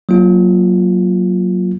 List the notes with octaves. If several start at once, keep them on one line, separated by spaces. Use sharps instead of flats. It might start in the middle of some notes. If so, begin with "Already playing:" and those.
F#3 A#3 F4